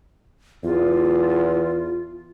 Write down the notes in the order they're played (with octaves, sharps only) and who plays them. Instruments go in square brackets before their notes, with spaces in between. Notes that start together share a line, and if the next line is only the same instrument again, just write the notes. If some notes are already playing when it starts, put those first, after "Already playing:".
[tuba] E2 [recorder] F4